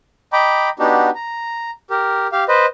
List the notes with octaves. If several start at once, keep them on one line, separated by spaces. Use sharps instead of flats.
D#5 G5 A#5 B5 D6
B3 D4 D#4 F#4 G4
A#5
G4 A#4
G4 F5
B4 C5 D#5